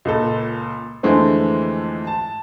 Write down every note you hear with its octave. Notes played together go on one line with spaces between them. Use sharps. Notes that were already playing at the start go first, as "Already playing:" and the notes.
C#2 A#2 A4
F2 D3 E3 G#3 A3 C4
A5